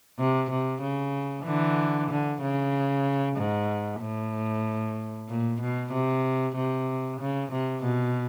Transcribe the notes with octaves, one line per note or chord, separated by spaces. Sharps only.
C3
C3
C#3
D3 E3
D3
C#3
G#2
A2
A#2
B2
C3
C3
C#3
C3
B2